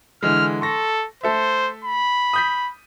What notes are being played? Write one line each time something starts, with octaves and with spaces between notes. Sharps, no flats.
D3 E3 G#3 F6
A4 C6 C#6 A#6
A3 A4 C5 E5
B5
D#6 G6 B6